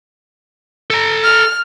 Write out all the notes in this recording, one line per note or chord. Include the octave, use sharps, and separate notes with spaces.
A4 A#5
F6